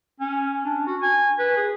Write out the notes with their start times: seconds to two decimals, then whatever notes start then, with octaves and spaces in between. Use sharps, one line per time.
0.20 C#4
0.65 D4
0.87 F#4
1.02 G#5
1.39 B4
1.57 G#4